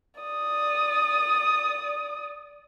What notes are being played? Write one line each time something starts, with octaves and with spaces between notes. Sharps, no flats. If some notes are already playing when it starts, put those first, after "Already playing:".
D5 D#6